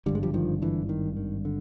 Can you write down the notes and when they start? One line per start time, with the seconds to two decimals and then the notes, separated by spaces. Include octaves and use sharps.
0.06 G#1 G2 D3 G3
0.15 G#3
0.23 F3 G3
0.34 D#3 F3
0.62 D3 E3
0.89 D#3
1.17 D#3
1.45 D3